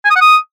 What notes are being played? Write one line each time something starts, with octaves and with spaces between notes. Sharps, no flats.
G#5
D#6
F#5
D#6